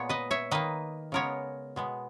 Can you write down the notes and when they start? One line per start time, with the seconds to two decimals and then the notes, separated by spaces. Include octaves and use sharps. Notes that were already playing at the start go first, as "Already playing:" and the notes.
Already playing: A#2 G#3 B3 C#5
0.09 B4 D#5
0.31 C#5 E5
0.51 D#3 A#3 B4 D#5
1.12 C#3 G#3 B3 A#4 C#5
1.76 B2 G#3 B3